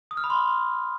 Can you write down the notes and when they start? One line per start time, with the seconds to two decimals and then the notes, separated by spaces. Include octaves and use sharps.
0.11 D#6
0.17 F6
0.24 B5
0.30 C6